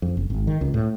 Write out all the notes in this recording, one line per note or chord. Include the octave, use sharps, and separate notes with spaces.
F2
F#1
G#1
D#3
C#2
A2